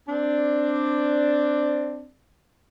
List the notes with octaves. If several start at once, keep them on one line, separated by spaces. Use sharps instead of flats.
C4 D4